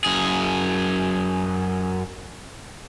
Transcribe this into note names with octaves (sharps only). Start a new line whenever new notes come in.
F#2 G#4